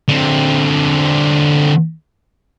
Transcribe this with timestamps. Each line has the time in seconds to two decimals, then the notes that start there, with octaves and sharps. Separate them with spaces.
0.08 D3 C4